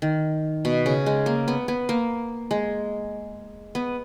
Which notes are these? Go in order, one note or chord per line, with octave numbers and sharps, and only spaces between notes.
D#3
B2
C#3
G#3
A#3
B3
B3
A#3
G#3
B3